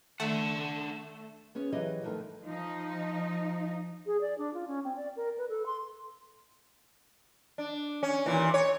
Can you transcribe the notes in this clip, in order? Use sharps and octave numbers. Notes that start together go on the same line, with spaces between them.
D#3 A3 D4 F#5 E7
B3 C#4 G#4 C#5
E3 F#3 G4 G#4 C#5 D#5
G2 D3 D#3 F3 A3
F3 D#4
G#4
D5
D4
F4
C#4
C4
D5
A#4
B4
A4
C6
D4
C#4
D#2 A#2 E3
C#5